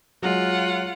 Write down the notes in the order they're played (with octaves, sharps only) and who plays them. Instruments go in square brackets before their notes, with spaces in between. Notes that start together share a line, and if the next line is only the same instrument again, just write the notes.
[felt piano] F#3 G#3 [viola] F4 F#5